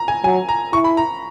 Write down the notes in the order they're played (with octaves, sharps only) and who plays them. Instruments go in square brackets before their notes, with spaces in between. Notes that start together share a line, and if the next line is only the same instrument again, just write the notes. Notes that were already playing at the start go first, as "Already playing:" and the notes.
Already playing: [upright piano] A#5
G#5
[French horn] F#3 [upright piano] G#5
[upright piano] A#5
[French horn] E4 [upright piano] C#6
[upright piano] B5
A#5